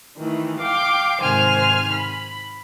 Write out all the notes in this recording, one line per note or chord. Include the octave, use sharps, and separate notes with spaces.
D#3 E3 A3
F5 G5 D6
G#2 C3 D#3 C5 G#5 F6
B5